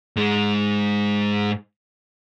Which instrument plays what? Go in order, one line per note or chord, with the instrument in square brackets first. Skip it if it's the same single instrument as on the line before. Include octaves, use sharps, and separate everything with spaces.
[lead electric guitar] G#2 G#3